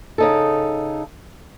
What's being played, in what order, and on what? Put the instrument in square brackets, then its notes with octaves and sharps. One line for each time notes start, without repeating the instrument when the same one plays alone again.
[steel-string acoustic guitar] C#3 D#4 A4